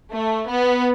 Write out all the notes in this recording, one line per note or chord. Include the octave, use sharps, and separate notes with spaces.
A3
B3